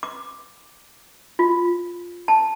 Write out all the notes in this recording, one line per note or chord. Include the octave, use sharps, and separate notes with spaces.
D6
F4
A5